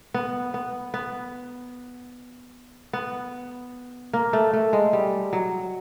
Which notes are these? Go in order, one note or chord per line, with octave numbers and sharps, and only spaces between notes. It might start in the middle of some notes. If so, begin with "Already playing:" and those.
B3
B3
B3
B3
A#3
A3
A3
G#3
G3
F#3